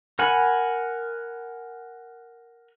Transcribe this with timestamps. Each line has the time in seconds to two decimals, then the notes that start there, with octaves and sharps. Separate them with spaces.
0.19 A#4 F#5 G#5 B5